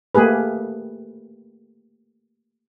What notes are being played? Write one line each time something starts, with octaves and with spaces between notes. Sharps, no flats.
A3 A#3 G4 G#4 B4